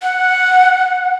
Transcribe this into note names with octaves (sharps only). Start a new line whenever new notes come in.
F#5